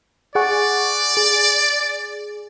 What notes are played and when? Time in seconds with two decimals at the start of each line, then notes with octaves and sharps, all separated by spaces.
0.35 G#4 D5 F#5 C#6
1.17 G#4